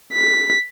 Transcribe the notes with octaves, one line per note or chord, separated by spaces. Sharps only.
B6